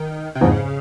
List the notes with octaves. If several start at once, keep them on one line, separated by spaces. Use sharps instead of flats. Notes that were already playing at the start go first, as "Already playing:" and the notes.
Already playing: D#3
C3
F2 G#2 C#3